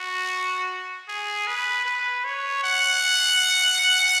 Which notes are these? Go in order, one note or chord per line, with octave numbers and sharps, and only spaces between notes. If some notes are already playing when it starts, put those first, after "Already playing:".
Already playing: F#4
G#4
B4
B4
C#5
F#5